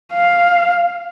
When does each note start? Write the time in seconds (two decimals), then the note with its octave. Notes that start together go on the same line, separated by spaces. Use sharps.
0.13 F5